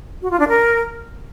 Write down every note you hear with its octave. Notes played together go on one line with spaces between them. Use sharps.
F#4
F4
D4
A#4